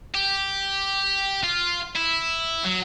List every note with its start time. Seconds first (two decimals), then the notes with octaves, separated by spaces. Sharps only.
0.15 G4
1.44 F4
1.96 E4
2.65 F#3